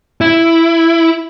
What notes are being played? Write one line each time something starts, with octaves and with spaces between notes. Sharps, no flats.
E4